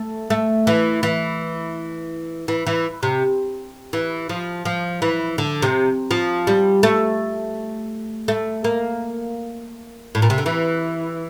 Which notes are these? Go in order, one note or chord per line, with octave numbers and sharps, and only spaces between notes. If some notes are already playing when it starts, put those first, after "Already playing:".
Already playing: A3
A3
E3
E3
E3
E3
C3
E3
F3
F3
E3
D3
C3
F3
G3
A3
A3
A#3
A2
A#2
C3
D3
E3